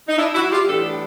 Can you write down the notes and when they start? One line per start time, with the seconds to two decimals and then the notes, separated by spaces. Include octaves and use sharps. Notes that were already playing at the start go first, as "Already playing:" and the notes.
0.09 D#4
0.18 D4 E4
0.35 E4 F#4
0.52 F4 G4
0.68 A2 E3 G3 B3 D4 G4 A4